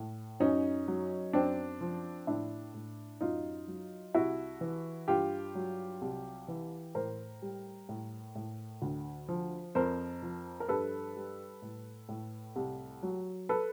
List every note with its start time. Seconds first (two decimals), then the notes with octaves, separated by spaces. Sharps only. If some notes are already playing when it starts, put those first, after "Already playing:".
Already playing: A2
0.40 F#2 C#4 D#4
0.88 F#3
1.33 F#2 C4 D4
1.81 F3
2.27 A2 D4 E4
2.74 A2
3.21 F#2 D#4 F4
3.68 F#3
4.14 C2 E4 F#4
4.61 E3
5.08 G2 F4 G4
5.55 F#3
6.01 C2
6.48 E3
6.95 A2 A#4 C5
7.42 G3
7.89 A2
8.35 A2
8.82 D2
9.29 F3
9.75 F2 A#4 C5
10.22 F3
10.60 A#4
10.69 G2 A4 B4
11.16 G3
11.62 A2
12.09 A2
12.56 C2
13.03 F#3
13.49 A4 B4